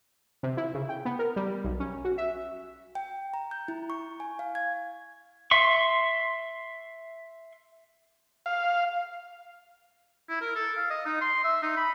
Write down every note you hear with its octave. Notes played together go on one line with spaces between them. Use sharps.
C3
E4
C#3
G5
B3
A#4
G3
B1
C#4
F#4
E5
G5
A#5
G6
E4
C#6
G#5
F5
G#6
E5 C6 C#6
F5
E4
A#4
A4
F5
D#5
D#4
C6
E5
D#4
B5